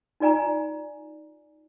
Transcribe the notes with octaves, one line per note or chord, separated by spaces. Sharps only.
D#4 F4 D5 G#5 A#5